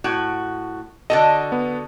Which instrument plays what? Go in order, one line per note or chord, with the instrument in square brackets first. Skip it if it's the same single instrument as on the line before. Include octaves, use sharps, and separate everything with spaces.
[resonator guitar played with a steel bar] A2 F#4
[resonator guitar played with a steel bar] D3 F#4 A4 [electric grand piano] D#5
[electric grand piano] B3